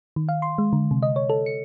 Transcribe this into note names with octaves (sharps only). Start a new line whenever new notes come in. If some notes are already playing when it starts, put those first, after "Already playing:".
D#3
F5
C6
G#3
D3
C3
D#5
C#5
A4
C#7